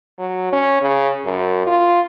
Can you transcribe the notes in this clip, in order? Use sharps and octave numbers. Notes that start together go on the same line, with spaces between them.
F#3
C#4
C#3
F#2
F4